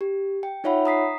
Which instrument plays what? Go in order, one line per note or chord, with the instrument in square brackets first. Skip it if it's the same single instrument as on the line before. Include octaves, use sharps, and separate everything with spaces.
[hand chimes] G4
G5
D#4 F4 C#5 E5 F#5 B5
A#5 D#6 B6 C7